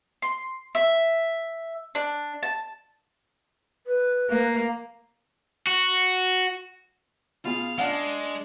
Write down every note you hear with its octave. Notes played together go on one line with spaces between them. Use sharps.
C6
E5
D4
A5
B4
A#3
F#4
B2 F4 G#4 F5
G#3 D4 F5 F#5 A5